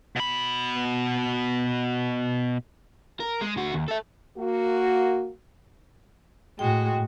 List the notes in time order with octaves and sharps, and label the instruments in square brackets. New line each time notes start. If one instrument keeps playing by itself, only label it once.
[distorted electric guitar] B2 B5
[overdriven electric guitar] A#4
G#3
D2 F#4
D#2
A4 E5
[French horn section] A#3 F#4
[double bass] A2 [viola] G#3 F#4 [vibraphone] G5